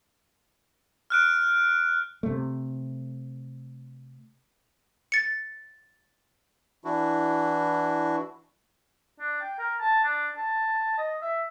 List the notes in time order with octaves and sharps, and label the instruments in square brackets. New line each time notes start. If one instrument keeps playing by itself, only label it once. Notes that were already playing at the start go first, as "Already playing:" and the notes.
[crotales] F6 F#6 D7
[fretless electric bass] C3 A3
[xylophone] A6 C#7
[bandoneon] E3 D4 E4 F#4
[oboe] D4
G5
A#4
A5
D4
A5
D#5
E5